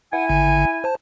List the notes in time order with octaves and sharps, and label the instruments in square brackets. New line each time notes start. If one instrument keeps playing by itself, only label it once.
[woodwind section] E4 G#5 [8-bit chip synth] F#5
[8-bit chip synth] G#1 D3
C5 A5